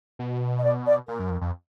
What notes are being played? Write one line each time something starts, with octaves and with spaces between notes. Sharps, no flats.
B2
D#5
D5
D5
A#2 A#4
F#2
F2
F2